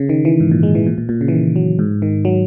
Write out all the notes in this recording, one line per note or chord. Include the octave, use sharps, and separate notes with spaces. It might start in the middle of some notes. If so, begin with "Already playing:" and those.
Already playing: C#3
D#3
E3
G#2
A#2
G#3
E3
A#2
A#2
A#2
C#3
E3
D#3
F#3
G#2
D#3
F#3